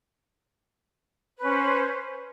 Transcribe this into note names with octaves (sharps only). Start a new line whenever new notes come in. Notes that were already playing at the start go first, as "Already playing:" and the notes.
C#4 B4 C5